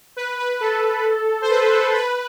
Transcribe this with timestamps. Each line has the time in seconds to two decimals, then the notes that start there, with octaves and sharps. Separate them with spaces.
0.16 B4
0.39 B4
0.61 A4
1.42 C5
1.50 B4
1.72 A4
1.95 B4